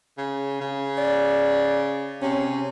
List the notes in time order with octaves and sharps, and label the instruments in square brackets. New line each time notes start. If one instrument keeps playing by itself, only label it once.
[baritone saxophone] C#3
C#3
[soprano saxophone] D5
[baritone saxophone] C3 [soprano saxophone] C#4